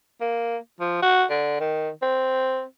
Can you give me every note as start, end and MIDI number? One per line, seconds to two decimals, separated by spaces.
0.21 0.57 58
0.81 1.01 53
1.02 1.25 66
1.30 1.56 50
1.60 1.90 51
2.02 2.64 60